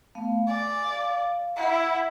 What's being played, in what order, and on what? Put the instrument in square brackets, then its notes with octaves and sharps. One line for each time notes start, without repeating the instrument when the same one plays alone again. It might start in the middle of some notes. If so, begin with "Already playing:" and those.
[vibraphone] A3 B3 F5
[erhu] D5 [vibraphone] G#5
[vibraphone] F5
[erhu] E4 [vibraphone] F#5